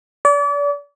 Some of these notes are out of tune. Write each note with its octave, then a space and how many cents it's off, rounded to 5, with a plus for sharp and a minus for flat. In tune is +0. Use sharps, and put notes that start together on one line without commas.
D5 -35